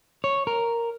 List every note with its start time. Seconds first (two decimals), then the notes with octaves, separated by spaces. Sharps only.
0.24 C#5
0.47 A#4